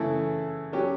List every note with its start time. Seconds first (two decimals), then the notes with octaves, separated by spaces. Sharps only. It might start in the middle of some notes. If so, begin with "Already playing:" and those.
Already playing: C#3 E3 A3 E4 A4
0.73 F#3 C#4 G4